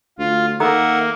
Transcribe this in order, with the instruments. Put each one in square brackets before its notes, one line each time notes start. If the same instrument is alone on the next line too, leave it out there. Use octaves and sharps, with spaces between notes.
[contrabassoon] D2 [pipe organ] F4
[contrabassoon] D#3 [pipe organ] A#3 [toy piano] A4 A#5 D#6 [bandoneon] E5 F#5